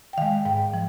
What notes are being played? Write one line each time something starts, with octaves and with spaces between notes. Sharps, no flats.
G5
D#3 G#3 F5
G#2 G5
F3